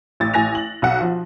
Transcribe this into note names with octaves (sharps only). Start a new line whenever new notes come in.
A1 A6
A1 G#5 A#6 F7
F#7
B1 F#5
F3